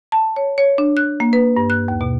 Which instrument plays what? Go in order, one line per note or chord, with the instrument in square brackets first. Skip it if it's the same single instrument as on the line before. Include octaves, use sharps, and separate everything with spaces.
[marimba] A5
C#5
C#5
D4
F#6
A#3
B4
G2
F#6
D#2
B2